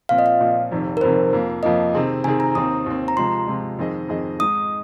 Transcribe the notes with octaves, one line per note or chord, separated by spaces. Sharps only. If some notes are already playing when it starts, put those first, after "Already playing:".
A#2 F3 C4 F5
D#5
F5
A#2 F3 C4
F1 F2 C3 D#3
A#4
F1 F2 C3 D#3 C5
F2 F3 A#3
F2 F3 A#3 D#5
C3 D#3 C4 G#4
C3 D#3 C4 G#4 G#5
A#5
D#2 D#3 C4 D#6
D#2 D#3 C4
A#5
C3 F3 G#3 C6
C3 F3 G#3
F2 D#3 C4 G#4 D#5
F2 D#3 C4 G#4 D#5
G#2 G#3 D#4 D#6